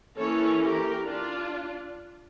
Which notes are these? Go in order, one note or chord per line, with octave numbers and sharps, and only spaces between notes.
E3 A#3 C#4 A4 C#5
G4 A#4
D4 F4